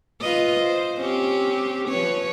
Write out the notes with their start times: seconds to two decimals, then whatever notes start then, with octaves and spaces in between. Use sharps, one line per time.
0.21 F4 B4 D#5
0.60 C5
1.00 C4 C#4 G4
1.88 F3 B4 C#5